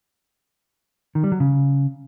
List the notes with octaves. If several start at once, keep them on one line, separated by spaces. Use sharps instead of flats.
D#3
G3
F#3
C#3